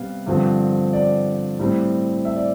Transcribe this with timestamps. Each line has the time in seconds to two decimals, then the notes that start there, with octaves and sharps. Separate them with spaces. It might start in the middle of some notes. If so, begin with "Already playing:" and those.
Already playing: C3 G3 B3 F5
0.26 G2 D3 F3 C4
0.93 D5
1.59 A2 G3 C4
2.25 E5
2.36 D5